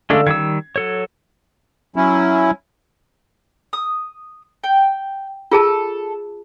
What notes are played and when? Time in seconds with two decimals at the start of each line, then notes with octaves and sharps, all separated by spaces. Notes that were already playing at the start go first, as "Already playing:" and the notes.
0.10 D3 G#3 A3 D4 F5 E6
0.27 D#3 G3 E6 G#6
0.76 F#3 A4 C#5
1.96 F#3 C#4 E4
3.73 D#6
4.64 G5
5.52 F4 G#4 A4 A5